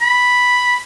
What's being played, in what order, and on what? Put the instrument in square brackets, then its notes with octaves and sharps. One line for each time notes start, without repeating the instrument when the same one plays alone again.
[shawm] B5